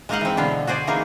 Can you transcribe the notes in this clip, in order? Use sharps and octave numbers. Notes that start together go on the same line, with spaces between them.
G#3 A#3 D#4 D#5 F5 F#5
E3 C4
B2 D3 B3 F5
F#4 G#4 C5 D5
E3 A#3 D#4 G#4